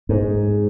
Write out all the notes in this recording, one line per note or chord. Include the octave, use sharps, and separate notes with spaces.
G#2